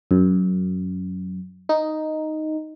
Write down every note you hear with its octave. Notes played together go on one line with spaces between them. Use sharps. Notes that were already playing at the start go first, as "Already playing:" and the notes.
F#2
D#4